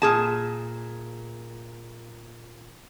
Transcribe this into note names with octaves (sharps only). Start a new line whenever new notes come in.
A#2 G#4 A5